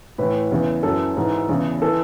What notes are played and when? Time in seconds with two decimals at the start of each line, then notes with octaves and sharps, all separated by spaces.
0.18 A2 E3 B4
0.51 E2 C#3 E3
0.83 F#2 E3 A4
1.17 G#2 E3
1.49 E2 C#3 E3
1.82 E3 A4